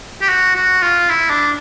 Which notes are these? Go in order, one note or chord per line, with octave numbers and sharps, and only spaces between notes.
G4
F#4
F#4
F4
E4
D4